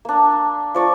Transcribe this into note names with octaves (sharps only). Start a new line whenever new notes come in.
A#3 D4
F3 D5 C#6